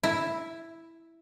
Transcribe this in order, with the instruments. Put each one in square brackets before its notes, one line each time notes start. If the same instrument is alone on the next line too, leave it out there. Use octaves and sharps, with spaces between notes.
[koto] E4